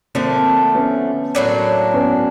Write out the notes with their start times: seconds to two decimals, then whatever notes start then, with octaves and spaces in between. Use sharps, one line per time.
0.15 D3 F3 A3 A#3 C4
0.75 B3 C#4
1.35 A2 F#3 A#3 D4
1.94 B3 C#4